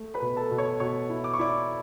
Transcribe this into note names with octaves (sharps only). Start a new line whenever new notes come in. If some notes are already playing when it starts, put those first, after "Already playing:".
Already playing: A3
B4 B5
B2
A4 A5
B2
C#5 C#6
B2 C#5 C#6
E4
D6
C#6
E4 D5 D6